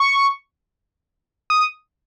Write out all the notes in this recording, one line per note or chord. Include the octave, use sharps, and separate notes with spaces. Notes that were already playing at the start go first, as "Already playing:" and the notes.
Already playing: C#6
D#6